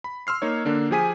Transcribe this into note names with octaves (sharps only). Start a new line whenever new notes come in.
B5
C6 E6 F6 C7
A#3 D#4 C#5
D3 A#3 D4
F3 G4 G#4 G#5 B6 D#7